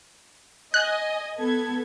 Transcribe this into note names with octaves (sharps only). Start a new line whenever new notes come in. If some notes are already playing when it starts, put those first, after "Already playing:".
D#5 G#5 F#6
B3 A4 G#6